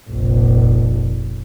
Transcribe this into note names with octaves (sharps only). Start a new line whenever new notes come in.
F1 A#1